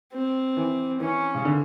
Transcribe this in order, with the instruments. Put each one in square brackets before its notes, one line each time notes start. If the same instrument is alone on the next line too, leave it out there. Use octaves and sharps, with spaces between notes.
[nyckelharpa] C4
[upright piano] E3
[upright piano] E3 [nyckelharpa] C#4
[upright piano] C#3
D3